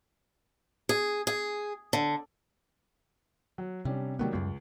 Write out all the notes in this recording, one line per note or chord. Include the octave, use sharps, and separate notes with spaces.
G#4
G#4
D3
F#3
C3 G3 C#4 D4
C3 D#3 F#3 G3 A3 B3
C#2 F#2 G3